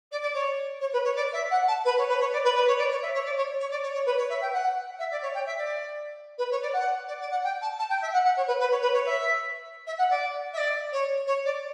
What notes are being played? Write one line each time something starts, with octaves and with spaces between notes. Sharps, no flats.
D5
D5
C#5
C#5
B4
C#5
D5
E5
F#5
A5
B4
C#5
B4
C#5
D5
B4
B4
C#5
D5
C#5
E5
C#5
D5
C#5
C#5
D5
C#5
C#5
B4
C#5
E5
G5
F#5
E5
D5
C#5
G5
E5
D5
B4
C#5
D5
F#5
D5
D5
F#5
G5
A5
A5
G5
E5
F#5
F#5
C#5
B4
B4
C#5
B4
C#5
E5
E5
F#5
D5
E5
D5
C#5
C#5
D5